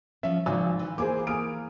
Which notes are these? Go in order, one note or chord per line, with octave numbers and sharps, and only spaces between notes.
F3 C#4 E5
G#1 C#3 F3 G#5 E6 F#6
E3
A#3 G#4 C5 G#5 D6
A#3 G#5 D#6 F6 D7